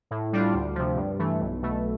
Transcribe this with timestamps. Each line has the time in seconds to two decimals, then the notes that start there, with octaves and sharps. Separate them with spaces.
0.11 A2
0.33 G3 D4 F4
0.53 D2
0.75 C3 F3
0.97 G2
1.19 E3 A3
1.40 B1
1.62 B2 A3